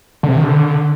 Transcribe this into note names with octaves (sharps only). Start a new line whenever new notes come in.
D3
C3
D#3
D3